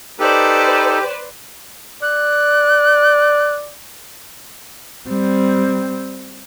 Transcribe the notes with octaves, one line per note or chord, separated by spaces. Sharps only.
D#4 G4 A4 B4 C5 D5
D5 F#6
G3 C4